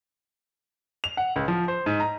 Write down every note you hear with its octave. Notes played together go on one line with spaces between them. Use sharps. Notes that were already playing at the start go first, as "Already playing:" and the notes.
F7
F#5
C#2
F3
C5
G#2
A#5